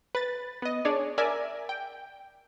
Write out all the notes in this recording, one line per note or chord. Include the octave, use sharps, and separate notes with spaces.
B4 A6
B3 D#5
D4 G#4 C#5 D5
A#4 D5 E5 G#5
G5